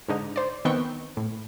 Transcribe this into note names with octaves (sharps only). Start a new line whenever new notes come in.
G#2 D3 D#4
C5 D5
D#3 B3 C4 G5 C#6
A2